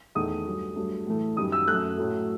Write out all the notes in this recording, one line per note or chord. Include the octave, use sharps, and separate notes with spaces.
E2 D#3 A3 D#6
G2 F#3 A3
G2 F#3 A3
A2 E3 A3
F#2 D#3 G3 D#6
E6
F#2 F#3 A3 F#6
A2 F#3 A3